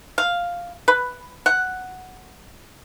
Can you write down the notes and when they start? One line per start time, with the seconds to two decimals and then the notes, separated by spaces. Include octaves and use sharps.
0.18 F5
0.88 B4
1.46 F#5